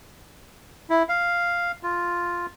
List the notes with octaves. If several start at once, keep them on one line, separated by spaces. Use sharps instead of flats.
E4
F5
F4